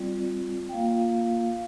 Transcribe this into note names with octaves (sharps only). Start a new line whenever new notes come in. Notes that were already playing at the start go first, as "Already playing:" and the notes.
Already playing: G3 C4 F4 D5
G5
A#3 F4 F5